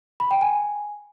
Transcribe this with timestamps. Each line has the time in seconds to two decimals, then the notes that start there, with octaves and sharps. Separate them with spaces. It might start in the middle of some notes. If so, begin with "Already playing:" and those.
0.20 B5
0.31 G5
0.41 G#5